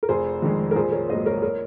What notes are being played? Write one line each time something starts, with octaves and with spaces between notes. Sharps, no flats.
A#4
F1 G#4 C5
F2 D#3 G#3
A#4
A#1 G#4 C5
A#4 C#5
G#2 F#3 A#3 C5 D#5
A#4 C#5
A#4 C#5